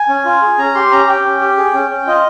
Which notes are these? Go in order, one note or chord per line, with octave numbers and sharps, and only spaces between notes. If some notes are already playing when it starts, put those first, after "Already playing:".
Already playing: G#5
C#4
F4
G#4
C#4 A#5
G4 C6
C#4 A#5
G4 G5
C#4
G4
G#4
C#4
C#4
F4 D#5